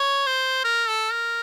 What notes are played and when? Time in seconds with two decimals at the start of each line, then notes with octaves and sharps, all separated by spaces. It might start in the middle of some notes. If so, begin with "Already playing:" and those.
Already playing: C#5
0.27 C5
0.64 A#4
0.89 A4
1.12 A#4